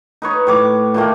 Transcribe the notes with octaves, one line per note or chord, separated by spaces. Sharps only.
D#4 B4 C#5
A2 C#5 D6
A#2 D#3 A3 A#3